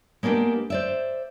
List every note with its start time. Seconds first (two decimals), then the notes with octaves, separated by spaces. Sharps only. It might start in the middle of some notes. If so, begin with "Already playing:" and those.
0.23 G#3 A#3 B3 D4 G4
0.70 C5 D5 E5